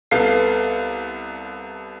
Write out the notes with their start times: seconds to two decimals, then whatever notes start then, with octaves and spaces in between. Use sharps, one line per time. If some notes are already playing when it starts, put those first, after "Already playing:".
0.11 C2 B3 A4 F5 C7